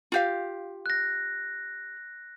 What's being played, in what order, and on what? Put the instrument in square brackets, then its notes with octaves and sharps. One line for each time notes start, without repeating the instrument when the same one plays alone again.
[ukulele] F4 G4 F5
[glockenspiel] F#6 A#6